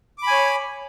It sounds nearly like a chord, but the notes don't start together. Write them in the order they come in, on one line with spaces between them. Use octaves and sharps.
D6 B5 G#5 C#5